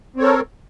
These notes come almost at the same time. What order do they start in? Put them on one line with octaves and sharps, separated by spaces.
C4 C#5 A4 A#4